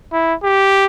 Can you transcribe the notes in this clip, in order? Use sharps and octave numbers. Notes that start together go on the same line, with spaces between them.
E4
G4